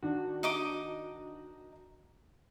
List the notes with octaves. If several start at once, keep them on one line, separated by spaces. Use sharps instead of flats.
D#3 D4 F#4
D#4 D#5 D6